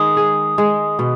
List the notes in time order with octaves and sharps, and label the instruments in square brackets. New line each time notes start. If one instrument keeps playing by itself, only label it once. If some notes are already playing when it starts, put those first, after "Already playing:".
Already playing: [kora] D#3 G#3 [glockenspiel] D#6
[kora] G#4
G#3
B2